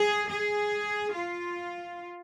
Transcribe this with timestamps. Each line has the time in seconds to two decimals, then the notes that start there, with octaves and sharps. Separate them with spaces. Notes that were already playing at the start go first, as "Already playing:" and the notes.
Already playing: G#4
0.30 G#4
1.14 F4